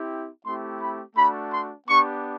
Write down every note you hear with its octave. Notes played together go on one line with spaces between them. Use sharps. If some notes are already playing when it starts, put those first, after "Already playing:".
Already playing: C4 E4 G4
A3 C4 E4 G4 C6
B5
A3 D4 F#4 B5
C6
B3 D4 G4 C#6